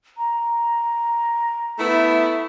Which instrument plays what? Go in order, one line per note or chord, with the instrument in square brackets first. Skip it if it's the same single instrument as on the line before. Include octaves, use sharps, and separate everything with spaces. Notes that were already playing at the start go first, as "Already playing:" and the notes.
[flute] A#5
[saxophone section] A3 B3 E4